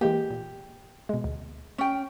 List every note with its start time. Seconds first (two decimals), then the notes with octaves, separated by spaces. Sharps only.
0.01 E3 G#3 A#3 G4
0.30 A#2
1.09 B2 G#3
1.24 D2
1.78 C#4 G5